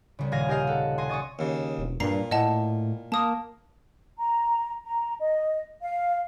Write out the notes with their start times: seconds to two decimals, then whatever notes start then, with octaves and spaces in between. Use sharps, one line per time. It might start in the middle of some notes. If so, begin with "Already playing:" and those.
0.19 C2 C#3
0.32 D#1 G#4 F5 G#5 A#6
0.48 G4 A#4 D#5 F5
0.67 A4 F#5
0.98 D#5 G#5 C6
1.09 C#5 D#5 C#6 D#6 A6
1.39 D#2 C#3
1.78 E1
2.00 G2 A#2 A#5 C7
2.31 A2 D#5 F#5 A5
3.12 A#3 A5 D#6
4.18 A#5
4.84 A#5
5.20 D#5
5.81 F5